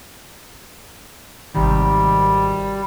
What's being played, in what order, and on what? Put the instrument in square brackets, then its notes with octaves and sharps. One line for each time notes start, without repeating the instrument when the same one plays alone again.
[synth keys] G#1 C3 D#3 [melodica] G3